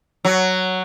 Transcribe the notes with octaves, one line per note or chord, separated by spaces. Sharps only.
F#3